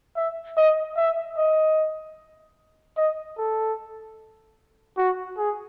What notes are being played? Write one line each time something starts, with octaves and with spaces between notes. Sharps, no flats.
E5
D#5
E5
D#5
D#5
A4
F#4
G#4